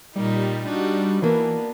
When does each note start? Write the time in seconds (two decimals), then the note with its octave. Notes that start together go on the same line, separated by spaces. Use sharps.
0.16 A#2 G3 A#3 D#4
0.66 D4 D#4 F#4
1.22 E3 A#3 B3 D4